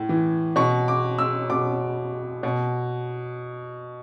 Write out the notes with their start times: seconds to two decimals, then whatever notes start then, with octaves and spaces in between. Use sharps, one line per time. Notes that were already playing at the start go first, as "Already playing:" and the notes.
Already playing: A2
0.09 E3
0.56 B2 C#6
0.88 D6
1.18 E6
1.50 B2 D6
2.43 B2